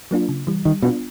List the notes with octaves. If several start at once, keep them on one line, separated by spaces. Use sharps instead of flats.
F#3 A#3 D4 F4
C#3
E3 G3
D#3 G3
B2 B3 D4 F4